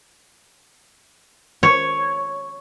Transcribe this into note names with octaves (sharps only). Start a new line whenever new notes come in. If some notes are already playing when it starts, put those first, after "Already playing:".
C#5